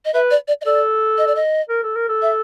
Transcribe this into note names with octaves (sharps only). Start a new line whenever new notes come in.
D#5
B4 E5
D5
D5
D#5
A4 D5
D#5
D5
D#5
A#4
A4
A#4
A4
E5